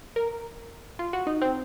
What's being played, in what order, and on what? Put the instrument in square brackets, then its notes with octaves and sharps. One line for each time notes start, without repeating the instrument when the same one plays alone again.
[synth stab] A#4
F4
F#4
D#4
C4